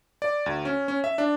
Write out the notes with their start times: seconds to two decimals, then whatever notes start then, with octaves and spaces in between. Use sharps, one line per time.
0.22 D5
0.46 D2
0.65 C#4
0.88 C#4
1.04 E5
1.18 D4